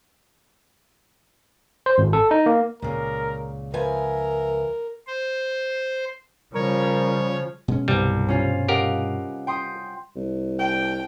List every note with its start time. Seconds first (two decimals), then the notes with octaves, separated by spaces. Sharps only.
1.86 C5
1.98 G#1
2.13 A4
2.31 D#4
2.46 A#3
2.82 C#2 A#2 C#3 A#4
3.74 F3 A#4 B4 E5 G#5
5.07 C5
6.55 C#3 F3 G3 A#4 C#5
7.68 B2 G#3 C#4
7.88 C2 G2 B2 G3
8.28 C#4 F4
8.69 G4 A#4 D#5 F5 F#5
9.47 G5 C6 D#6
10.16 C2
10.59 G5